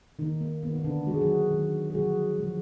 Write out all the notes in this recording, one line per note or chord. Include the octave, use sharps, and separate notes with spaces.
D#3 A#3 D#4
A#3
D#3 A#3 B3
B3
D3 D4
D#3 G#3 F#4 G#4
F#3 F#4
D#3 G#3
G#4
D3 F3 F#3 G#3 F#4
D3 F3 G#3